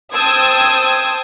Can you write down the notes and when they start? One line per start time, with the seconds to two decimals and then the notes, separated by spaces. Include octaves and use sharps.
0.14 C5 G5 A5 D#6 E6 G#6